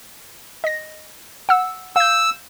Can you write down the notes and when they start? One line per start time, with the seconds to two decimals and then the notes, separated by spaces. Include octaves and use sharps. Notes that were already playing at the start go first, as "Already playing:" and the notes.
0.64 D#5 A#6
1.49 F#5 E6
1.96 F5 E6 G6